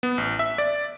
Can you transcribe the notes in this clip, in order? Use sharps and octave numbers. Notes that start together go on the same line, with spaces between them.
B3
A1
E5
D5